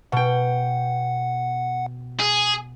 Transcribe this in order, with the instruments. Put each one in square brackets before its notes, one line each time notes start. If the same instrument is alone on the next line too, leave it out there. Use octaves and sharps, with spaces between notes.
[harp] B2 G5 [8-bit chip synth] F#5
[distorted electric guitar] G#4